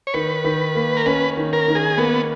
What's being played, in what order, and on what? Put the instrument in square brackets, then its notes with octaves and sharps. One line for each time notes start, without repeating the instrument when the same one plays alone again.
[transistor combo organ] C#5
[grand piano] D#3 [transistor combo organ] B4
[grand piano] D#3
A#3
[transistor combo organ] A#4
[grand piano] C#4 [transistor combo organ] B4
[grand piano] D#3
[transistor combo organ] A#4
[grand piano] D#3
[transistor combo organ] G#4
[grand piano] A#3 [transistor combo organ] B3